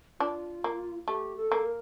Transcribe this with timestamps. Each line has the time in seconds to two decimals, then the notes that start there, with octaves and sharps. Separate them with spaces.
0.20 D4 F4
0.64 A#3
1.07 A3 G4
1.37 A4
1.52 A#3
1.66 A#4